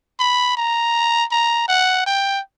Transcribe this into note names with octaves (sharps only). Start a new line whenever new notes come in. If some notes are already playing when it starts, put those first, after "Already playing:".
B5
A#5
A#5
F#5
G5